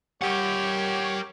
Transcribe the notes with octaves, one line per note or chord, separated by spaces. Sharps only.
G4 A#4 C#5 F#5